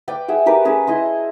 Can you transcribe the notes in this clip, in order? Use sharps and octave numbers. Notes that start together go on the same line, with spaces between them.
B4 D5 G5
G#4 E5 F#5
F#4 G4 A#4 B4
C#4 G#4 A5
E4 D#5 C6